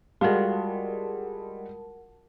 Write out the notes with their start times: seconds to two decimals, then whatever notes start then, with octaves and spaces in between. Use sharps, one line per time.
0.21 G3 G#3 F4 F#4 A#4 F#5 A5